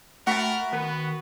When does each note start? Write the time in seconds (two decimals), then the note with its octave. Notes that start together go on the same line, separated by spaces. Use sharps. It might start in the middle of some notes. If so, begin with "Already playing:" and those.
0.27 A3 F#4 A#4 F#5 A5 B5
0.73 D#3 B3 B4